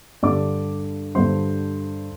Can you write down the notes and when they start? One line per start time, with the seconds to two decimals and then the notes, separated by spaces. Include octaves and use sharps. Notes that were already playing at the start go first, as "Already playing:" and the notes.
0.23 G2 D3 G3 D5 D6
1.15 G2 D3 G3 C5 C6